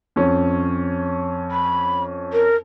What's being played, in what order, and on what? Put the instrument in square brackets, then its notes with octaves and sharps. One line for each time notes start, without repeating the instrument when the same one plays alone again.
[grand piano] F2 C#4
[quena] B5
A#4